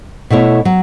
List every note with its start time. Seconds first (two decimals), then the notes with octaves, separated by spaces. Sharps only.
0.30 B2 A3 E4 C#5
0.65 F#3